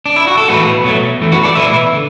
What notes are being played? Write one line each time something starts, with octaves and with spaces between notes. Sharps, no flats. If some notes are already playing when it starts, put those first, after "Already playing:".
D4
E4
F#4
A4
A2 E3 A3 F#4 B4
B2 F#3 A3
F#2 E3 A3
F#4 B4
A4 D5
E2 B2 A3 B4 E5
D3